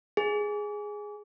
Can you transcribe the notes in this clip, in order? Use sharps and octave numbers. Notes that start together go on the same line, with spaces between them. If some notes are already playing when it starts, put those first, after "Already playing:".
G#4